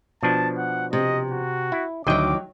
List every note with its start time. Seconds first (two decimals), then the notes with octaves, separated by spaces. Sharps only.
0.23 B2 F3 D4 A5
0.58 F#5
0.93 C3 D#5
1.31 F#4
1.72 E4
2.07 D2 D#3 F3 F#3 D#5 G5 D6